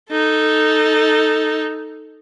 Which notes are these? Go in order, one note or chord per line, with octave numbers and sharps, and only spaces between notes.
D#4 A4